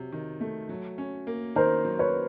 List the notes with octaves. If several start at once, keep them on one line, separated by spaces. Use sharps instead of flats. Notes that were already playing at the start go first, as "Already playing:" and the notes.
Already playing: C3 F#3
D#3
A3
F#3
C#4
A#3
D#3 A#4 C5
F#3
B4 C#5